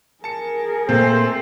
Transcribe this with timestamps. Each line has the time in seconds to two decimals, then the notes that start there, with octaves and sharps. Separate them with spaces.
0.24 G#4 A#4 A5 C#7
0.89 A#2 A3 A#3 C4 A4 C5